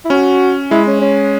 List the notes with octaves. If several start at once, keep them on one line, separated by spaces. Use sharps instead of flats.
E4
C#4 F#4
G#3 E4
C#4
C#4